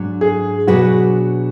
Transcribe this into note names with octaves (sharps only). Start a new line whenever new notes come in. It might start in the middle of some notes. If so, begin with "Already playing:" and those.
Already playing: G#2 F#3 D4
G#4
B2 F#3 D4 F#4 G#4 B4